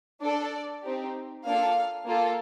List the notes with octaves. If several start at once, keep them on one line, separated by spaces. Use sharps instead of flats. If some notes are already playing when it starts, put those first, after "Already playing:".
D4 A4 D5
C4 D#4 G4
A#3 D4 F4 A4 F5
A#3 F4 A4